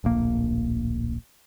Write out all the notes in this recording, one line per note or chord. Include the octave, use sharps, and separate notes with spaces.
D1 A#1 A#3